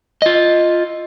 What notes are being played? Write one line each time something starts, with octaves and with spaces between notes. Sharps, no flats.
F4 D#5